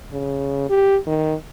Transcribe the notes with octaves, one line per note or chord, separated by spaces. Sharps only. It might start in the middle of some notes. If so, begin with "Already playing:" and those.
C#3
G4
D#3